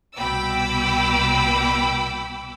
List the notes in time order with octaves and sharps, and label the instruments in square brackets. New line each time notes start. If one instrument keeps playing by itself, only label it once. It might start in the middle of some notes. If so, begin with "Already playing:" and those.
[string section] C2 B2 G5 B5 D6 E6